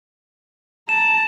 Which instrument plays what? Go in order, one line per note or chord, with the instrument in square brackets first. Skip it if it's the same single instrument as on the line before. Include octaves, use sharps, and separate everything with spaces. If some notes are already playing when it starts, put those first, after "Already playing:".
[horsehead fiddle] A5 A#5 [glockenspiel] E7